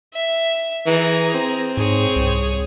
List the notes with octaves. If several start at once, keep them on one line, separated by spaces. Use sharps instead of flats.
E5
E3 G#4 A#5
C4
G#2 G#4 C#5
C2